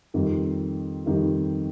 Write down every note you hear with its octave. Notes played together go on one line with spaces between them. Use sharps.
F2 D#3 G3
F2 D#3 G3